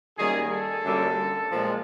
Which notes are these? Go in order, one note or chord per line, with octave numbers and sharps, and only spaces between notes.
F#2 D#3 G3 A#3 G#4
A4
F#2 D3 G3 A#3
A#2 F3 G#3